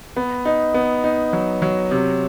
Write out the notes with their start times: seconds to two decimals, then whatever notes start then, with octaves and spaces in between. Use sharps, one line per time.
0.17 B3
0.45 D#4
0.74 B3
1.04 D#4
1.33 F#3
1.62 F#3
1.91 C3